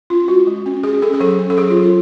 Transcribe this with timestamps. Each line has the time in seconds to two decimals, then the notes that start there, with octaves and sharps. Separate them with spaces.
0.10 C#4 F4
0.28 G#3 F#4
0.47 G#3
0.66 C#4
0.84 C#4 G#4
1.02 C#4 A4
1.14 G#4
1.20 F#3 A4
1.39 C#4
1.50 A4
1.58 F#3 G#4
1.70 F4
1.76 F#3
1.82 F4